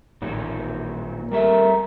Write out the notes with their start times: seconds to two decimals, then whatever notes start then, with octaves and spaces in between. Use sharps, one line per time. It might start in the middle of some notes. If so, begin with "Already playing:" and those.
0.22 A1 A#2 D#3 F#3
1.32 G3 A3 A#4 E5